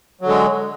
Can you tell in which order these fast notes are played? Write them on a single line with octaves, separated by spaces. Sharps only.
F#3 D3 G#3